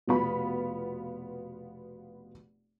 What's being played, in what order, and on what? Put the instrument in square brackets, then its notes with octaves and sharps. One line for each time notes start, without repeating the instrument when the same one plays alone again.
[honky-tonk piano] F1 B2 B3 F4 B5